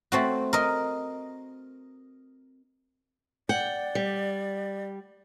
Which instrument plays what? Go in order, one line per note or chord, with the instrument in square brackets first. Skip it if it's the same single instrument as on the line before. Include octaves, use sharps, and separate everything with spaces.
[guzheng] A3 C4 F#4
A#4 D#5
[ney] D5 [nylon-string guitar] F#5 [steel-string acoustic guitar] G5
[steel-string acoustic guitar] G3